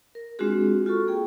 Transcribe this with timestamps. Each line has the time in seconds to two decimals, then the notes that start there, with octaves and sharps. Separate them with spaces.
0.15 A#4
0.39 G#3 C4 D4 F4 F#4 G#4
0.86 F4 F#4 A4 C#6
1.07 A#3 G#4 G5